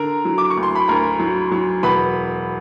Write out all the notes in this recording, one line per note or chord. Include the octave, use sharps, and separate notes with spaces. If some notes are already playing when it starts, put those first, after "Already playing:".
Already playing: D3 A#4 A#5
F#3
D6
C#6
D2
C6
B5
D2 A#4 A#5
F#3
F#3
E1 B4 B5